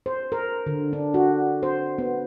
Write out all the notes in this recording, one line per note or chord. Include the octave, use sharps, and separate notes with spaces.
C5
A#4
D3
D4
F#4
C5
B3